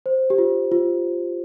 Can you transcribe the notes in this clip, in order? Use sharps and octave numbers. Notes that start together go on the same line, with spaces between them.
C5
G4
F4
F4